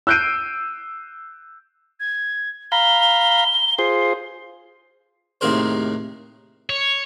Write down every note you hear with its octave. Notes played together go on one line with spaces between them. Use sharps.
E6 F#6 G6 C7 D7 D#7
G#6
F5 A#5 B5 G7
F4 G#4 C5 C7
D#2 A2 C3 G#4 A#4 C5
C#5